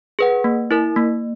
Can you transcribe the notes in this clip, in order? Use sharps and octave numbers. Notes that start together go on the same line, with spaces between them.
G#4 B4 F#5
A#3
E4 A#4
A#3